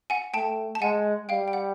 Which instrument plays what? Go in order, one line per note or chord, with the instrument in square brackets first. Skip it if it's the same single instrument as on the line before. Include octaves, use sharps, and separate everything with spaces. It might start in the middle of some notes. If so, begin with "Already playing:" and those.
[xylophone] F#5 G#5
[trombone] A3 [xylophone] G5 A5
[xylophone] A5
[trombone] G#3 [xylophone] F#5 G#5
[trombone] G3 [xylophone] F5 G5
[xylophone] G5
F#5